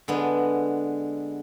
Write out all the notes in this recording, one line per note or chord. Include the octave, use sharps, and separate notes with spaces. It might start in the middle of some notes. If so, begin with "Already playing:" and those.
D3 G#3 B3